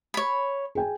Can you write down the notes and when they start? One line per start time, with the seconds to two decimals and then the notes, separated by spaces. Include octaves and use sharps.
0.14 C#5 B5
0.75 G#4 G5 G#5